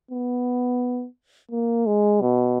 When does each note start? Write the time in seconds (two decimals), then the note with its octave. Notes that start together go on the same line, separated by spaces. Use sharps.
0.11 B3
1.51 A#3
1.86 G#3
2.21 B2